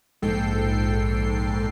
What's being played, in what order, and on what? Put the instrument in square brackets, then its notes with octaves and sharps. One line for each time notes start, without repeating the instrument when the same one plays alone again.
[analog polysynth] A#1 G#2 A4 G5 C7